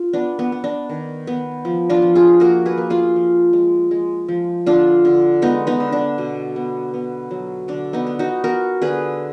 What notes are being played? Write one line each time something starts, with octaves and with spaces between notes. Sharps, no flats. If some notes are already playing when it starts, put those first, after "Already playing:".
Already playing: F4
B3 D4
B3
B3
D4
D#3
B3
F3
D4 F4
F3
F4 G#4
A#3 F#4 A#4
G#4 B4
A#3
F4 G#4
F3
G#3
G#3
F3
D3 D4 F4
D3
G#3 B3 D#4
B3 D#4
D3
D4
B2
B3
B3
F#3
D3 D4
B3 D#4
B3
D#4 F#4
B3 F#4 A#4
D3 G#4 B4